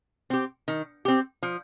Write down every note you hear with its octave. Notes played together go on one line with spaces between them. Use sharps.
C4 G4
D#3
C4 G4
F3